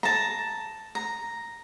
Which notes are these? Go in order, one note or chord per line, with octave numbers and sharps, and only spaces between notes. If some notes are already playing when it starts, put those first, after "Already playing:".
A5 A#5
A#5